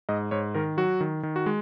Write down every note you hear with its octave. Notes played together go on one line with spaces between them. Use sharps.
G#2 D#5
G#2 C#5
D#3 A#4
F#3 F#4
D#3
D#3
F#4
G#3